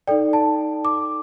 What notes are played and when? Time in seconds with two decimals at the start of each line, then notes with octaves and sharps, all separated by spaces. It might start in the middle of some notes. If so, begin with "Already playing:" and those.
0.07 D#4 A4 D5 G5
0.33 A5
0.85 D6